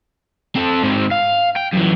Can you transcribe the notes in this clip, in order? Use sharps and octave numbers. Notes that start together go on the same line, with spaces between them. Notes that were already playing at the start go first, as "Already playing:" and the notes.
C4 A4
G#2 C4
F5
G5
F#2 E3